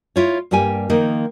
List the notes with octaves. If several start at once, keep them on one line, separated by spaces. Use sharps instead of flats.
E4 F4 C#5
G2 G3 A#3 G4 G#5
D#3 F3 A#3 D#4